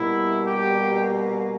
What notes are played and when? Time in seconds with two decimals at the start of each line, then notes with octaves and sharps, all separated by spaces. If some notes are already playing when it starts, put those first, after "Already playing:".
Already playing: B2 G3 A#3 E4
0.46 G4